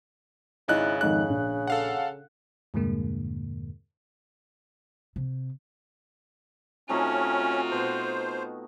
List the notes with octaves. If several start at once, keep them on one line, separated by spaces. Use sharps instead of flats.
G#1 C#3 D#4 E4 D#5 F#6
F2 G#2 D#3 F#6
A#1
A4 F5 F#5
E2 G2 A#2 D3 G#3 A#3
C3
C3 A3 C#4 D#4 F4 F#4
B2 C5